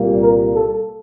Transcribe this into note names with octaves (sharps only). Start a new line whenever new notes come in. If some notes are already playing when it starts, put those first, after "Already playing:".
Already playing: C2 A#2 G3 A#3
A#4
A4